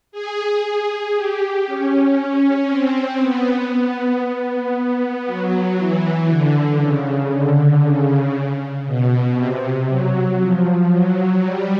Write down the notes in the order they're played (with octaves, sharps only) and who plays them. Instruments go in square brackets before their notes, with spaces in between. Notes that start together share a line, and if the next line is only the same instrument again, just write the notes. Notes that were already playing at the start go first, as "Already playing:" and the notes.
[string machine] G#4
G#4
G4
C#4
C4
B3
B3
F#3
E3
D3
C#3
D3
C#3
B2
C3
F#3
F3
F#3
G3